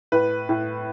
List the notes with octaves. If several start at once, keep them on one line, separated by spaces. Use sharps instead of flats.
A2 B4
A2